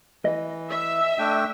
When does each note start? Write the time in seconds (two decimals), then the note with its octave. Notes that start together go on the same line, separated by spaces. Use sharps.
0.25 E3 D#5
0.70 E5
1.19 A3 D4 G5